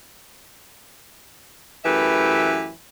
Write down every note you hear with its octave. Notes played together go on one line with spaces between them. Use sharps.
F#2 E3 A3 G4 B4 E5